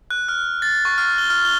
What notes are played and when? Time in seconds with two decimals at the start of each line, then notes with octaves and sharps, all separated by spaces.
0.10 F#6
0.28 F6
0.62 A6
0.85 C#6
0.98 F6
1.18 G7
1.30 F6
1.45 G7